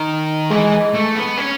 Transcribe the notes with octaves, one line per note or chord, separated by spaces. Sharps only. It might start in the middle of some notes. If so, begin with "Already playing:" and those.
Already playing: D#3
E3 G#3
A3
B3
C#4